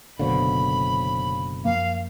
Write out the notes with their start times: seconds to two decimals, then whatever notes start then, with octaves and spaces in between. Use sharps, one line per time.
0.19 F#1 B2 D3 C5 C#5 F5 B5
1.65 F#2 F3 A#3 F5